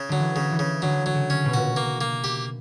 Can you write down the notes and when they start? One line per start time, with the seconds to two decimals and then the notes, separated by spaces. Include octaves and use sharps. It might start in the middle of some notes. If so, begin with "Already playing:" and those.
Already playing: C#3
0.09 D3 F#3
0.19 E3
0.36 C#3
0.51 E3
0.59 C#3
0.82 D3 F#3
1.06 F#3
1.15 C#3
1.30 C#4
1.45 B2
1.53 A#2 F#4
1.61 B2
1.76 A#3
2.01 A#3
2.24 G4